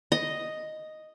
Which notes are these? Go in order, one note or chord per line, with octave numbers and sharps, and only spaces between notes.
D#5